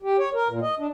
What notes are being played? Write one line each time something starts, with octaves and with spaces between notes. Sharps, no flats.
G4
C#5
A#4
A#2
D#5
D4